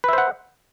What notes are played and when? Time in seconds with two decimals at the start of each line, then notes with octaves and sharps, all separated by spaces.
0.04 B4
0.09 E5
0.13 C5
0.18 F#5